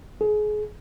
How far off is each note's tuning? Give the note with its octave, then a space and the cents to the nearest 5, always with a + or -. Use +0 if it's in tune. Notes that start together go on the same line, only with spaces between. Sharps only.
G#4 +30